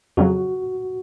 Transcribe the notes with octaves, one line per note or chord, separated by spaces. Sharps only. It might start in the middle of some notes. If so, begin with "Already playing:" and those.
F2 C#3 F#3 F#4